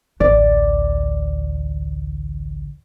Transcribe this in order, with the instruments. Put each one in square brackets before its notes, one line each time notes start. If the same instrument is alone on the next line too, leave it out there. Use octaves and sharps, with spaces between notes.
[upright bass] A1 D2 [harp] D5